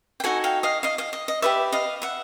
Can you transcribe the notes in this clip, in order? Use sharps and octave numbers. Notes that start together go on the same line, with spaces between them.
G5
D#4 F#4 A4 F#5 G#5
F5 G5
D#5 F5
D#5 F5
D#5 F5
D#5
D#5
G4 B4 D5 E5
D#5 F5
E5 F#5